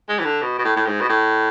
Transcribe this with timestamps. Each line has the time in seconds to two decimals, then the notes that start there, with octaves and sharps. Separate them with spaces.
0.09 G#3
0.19 E3
0.25 D3
0.42 B2
0.59 B2
0.65 A2
0.77 A2
0.87 G#2
1.01 B2
1.09 A2